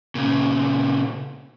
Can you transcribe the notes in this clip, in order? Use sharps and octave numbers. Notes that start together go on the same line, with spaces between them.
A#2 C#3